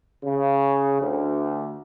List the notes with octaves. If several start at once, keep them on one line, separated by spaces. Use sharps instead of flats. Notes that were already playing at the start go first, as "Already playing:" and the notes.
C#3
D2